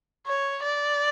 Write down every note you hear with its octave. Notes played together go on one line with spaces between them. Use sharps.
C#5
D5